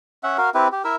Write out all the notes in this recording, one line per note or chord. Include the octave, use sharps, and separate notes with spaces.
C#4 E5 F#5
F#4 A#4 F5
C4 E4 G4 B4
G4
E4 A#4 E5 E6